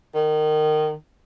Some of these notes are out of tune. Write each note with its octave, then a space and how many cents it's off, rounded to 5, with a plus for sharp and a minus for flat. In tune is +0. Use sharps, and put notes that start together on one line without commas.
D#3 -25